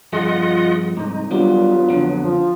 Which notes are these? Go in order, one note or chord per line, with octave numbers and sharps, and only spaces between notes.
G2 F3 F4 G#4 D#5 F#5
C2 G#2 D#4
D#3 F#3 G3 B3 D4 F4
F2 D3
F3